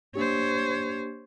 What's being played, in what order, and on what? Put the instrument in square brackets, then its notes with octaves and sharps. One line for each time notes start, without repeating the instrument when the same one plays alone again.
[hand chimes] A#3 D4 G4 [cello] C5 C#5